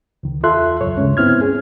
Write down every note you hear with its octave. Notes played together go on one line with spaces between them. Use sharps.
C#2 D#3
E2 F4 A4 E5 C6 F#6
C#2 F#2 C#5
D2 G2 C#3 G#3 C#4
G#2 B3 C4 E4 F6 G#6
C#4 G#4